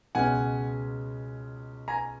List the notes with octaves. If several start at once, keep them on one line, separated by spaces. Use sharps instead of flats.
C#2 B2 G#3 C#4 F#5 G#5
G#5 A#5